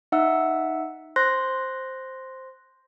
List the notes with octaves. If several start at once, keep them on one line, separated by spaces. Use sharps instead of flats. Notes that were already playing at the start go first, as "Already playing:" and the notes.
D#4 E5 F#5 E6
C5 C6 F#6 A#6